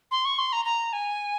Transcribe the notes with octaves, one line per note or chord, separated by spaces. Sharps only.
C6
C#6
C6
A#5
A#5
G#5